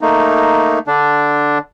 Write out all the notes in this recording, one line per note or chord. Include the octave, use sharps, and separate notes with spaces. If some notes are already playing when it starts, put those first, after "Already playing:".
A3 A#3 D#4
D3 D4